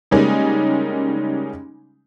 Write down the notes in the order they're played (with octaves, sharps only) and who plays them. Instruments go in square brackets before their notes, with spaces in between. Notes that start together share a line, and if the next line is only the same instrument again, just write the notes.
[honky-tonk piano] C#3 G3 G#3 A#3 C#4 D#4